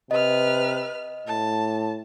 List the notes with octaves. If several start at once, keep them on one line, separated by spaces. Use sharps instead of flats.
C3 B4 D#5 F6
A2 A5